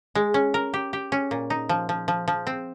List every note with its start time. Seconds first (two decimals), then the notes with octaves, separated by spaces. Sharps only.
0.15 G#3
0.34 C#4
0.54 A#4
0.74 G4
0.93 G4
1.12 C#4
1.31 A#2
1.50 D#4
1.69 F3
1.89 F3
2.08 F3
2.28 F3
2.47 C4